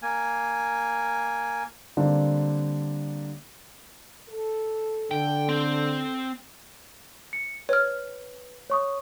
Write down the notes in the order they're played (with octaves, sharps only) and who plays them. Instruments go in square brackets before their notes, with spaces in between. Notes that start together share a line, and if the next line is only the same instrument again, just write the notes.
[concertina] A#3 G#5
[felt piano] D3 G3 A#3 C4 D4
[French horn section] A4
[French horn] D3 [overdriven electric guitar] G5
[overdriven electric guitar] C4
[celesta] C#7
[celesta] B4 [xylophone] C#5 F6
[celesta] C#5 C#6 D#6